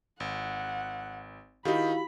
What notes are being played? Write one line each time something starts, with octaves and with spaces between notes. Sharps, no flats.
G#1 F#5
D#3 D#4 E4 F#4 G4 F5 B5